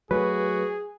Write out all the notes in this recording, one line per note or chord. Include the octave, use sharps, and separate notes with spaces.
F#3 A3 F#4 G#4 B4